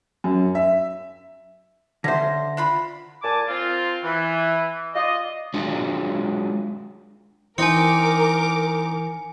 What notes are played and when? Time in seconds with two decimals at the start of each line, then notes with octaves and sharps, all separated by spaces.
0.24 F#2
0.55 E5
2.04 D3 C#4 C5 E5 F#5 A#6
2.57 D4 F4 B5
3.22 A#2 G#5 A5 D6
3.47 C4 F4
4.03 E3
4.94 F4 D5 D#5
5.54 F#3 G#3 D4 F4
7.58 E3 C4 D#4 A#4 G#5 D6 C#7